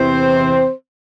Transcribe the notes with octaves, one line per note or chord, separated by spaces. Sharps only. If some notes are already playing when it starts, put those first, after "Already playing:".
Already playing: E2 C3 E3 C4 C5